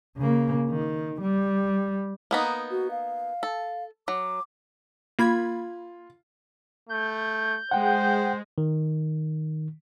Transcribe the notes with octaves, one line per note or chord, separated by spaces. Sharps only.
C#3 A#3
D#3
G3
A#3 B3 D#4
F#4
F5
A4
F#3 D6
A#3 F4 B5 G#6
A3 G6
G#3 C5 F#5 G5
D#3